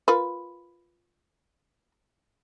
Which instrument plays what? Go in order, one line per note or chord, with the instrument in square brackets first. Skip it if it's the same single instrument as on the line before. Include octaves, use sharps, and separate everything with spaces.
[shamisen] F4 A#4 B4